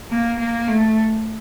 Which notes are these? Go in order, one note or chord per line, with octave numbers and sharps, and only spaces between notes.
A#3
A#3
A3